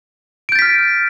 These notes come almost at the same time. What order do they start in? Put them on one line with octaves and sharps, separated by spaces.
D7 G6 A6 B6 F6